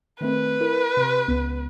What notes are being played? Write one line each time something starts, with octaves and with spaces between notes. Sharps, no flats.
D#3 A3 C4 B4
E4 A#4
C3 C6
C#2 B3